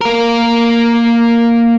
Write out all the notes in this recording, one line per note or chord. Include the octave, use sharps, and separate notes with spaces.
A#3 A#4